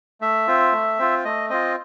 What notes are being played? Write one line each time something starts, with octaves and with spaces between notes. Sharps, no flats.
A3 E5
C4 F4
A3
C4 F4
A3 D#5
C4 F4 D#5